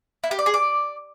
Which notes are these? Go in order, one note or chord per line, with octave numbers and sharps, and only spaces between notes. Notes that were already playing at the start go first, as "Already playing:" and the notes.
E4
G4
D5
G#4
D5